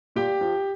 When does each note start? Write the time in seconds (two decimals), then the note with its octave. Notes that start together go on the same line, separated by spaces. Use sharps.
0.16 A#2 G4 G5
0.41 F3